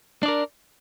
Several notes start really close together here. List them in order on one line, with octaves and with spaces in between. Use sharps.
D4 D5 A#4